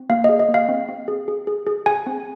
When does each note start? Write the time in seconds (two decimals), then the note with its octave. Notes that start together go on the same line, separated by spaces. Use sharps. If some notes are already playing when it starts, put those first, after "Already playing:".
Already playing: C4
0.09 A#3 F5
0.24 D#5
0.29 G#4
0.39 D#5
0.49 A#3
0.54 F5
0.69 C4
0.89 C4
1.08 G#4
1.28 G#4
1.47 G#4
1.67 G#4
1.86 G#4 G#5
2.06 C4